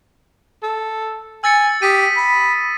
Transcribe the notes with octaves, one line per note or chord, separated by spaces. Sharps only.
A4
G#5 E6 A6 C#7
G4 D#6 B6 D#7
B5